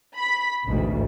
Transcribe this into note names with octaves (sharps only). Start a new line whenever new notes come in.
B5 B6
A1 D2 G#2 B2